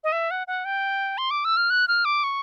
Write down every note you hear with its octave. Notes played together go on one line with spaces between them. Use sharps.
D#5
E5
F#5
F#5
G5
C6
D6
E6
F6
F#6
F6
D6
C#6